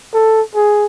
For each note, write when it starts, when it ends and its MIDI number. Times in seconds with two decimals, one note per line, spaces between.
0.14 0.41 69
0.55 0.86 68